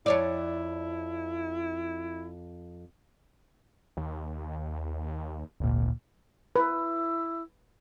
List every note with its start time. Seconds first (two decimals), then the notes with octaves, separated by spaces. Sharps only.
0.06 F2 E4 C#5 D5
3.97 D#2
5.60 G#1 D2 A#2
6.56 E4 B4